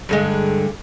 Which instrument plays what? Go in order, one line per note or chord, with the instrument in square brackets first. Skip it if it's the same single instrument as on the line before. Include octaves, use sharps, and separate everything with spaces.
[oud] G2 D3 G#3